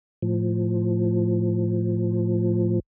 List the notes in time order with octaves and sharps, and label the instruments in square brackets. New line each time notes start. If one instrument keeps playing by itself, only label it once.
[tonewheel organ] A2 F3